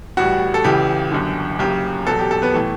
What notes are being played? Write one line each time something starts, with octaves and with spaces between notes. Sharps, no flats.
A1 A2 G3 F#4 F#5
A4
C#2 C#3 E3 G4
G1 F#2 D3
F#1 F#2 C#3 G4
E1 E2 B2 F#3 A4
G4
A4
B3 B4
A2 E3 A3